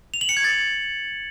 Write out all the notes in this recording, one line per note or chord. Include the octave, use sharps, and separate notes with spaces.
F7
F#7
C#7
G#6
A6